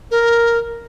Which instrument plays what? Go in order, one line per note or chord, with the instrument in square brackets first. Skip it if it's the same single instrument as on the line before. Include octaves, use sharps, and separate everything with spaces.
[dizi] A#4